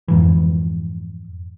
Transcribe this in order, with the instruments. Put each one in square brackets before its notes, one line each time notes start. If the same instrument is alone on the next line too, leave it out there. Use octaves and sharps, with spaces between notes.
[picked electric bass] F2 G#2 E3